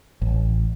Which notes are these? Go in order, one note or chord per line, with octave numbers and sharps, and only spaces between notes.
A1